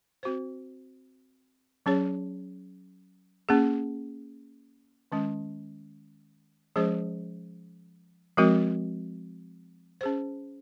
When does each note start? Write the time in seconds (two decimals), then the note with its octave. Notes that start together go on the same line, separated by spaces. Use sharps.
0.23 C4 F#4 C5
1.86 F#3 C#4 G#4 C#5
3.49 A#3 C#4 G#4
5.12 D#3 G#3 C#4
6.76 F3 G#3 C#4 G#4 C5
8.37 F3 G#3 C4 F#4 A#4
10.01 C#4 G#4 C5